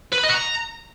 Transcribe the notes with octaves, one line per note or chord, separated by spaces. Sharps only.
B4
B5
D#5
F#4
A#5